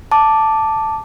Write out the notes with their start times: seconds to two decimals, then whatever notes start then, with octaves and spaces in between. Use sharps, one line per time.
0.12 A5 D6